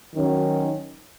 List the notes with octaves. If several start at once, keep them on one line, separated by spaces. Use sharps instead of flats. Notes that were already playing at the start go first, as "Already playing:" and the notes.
D#3 F#3 C#4